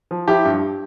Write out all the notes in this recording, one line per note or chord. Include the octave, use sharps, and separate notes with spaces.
F3
F3 E4 G4
G2